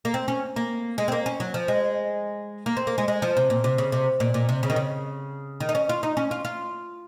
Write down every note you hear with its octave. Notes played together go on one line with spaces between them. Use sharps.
A#3
C4
C#4
A#3
G#3
C4
A#3
C#4
F#3
F3
G#3
A#3
C4
A#3
G#3
G#3
F3
C3
A#2
C3
C#3
C3
A#2
A#2
C3
C#3
D#3
C#3
D#3
D#4
C#4
F4
D#4
C#4
F4
F4